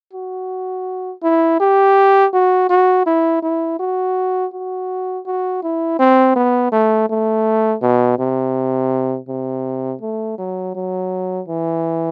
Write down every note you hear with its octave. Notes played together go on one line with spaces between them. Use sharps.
F#4
E4
G4
F#4
F#4
E4
E4
F#4
F#4
F#4
E4
C4
B3
A3
A3
B2
C3
C3
A3
F#3
F#3
E3